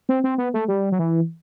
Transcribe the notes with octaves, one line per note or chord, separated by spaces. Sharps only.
C4
C4
B3
A3
G3
F#3
E3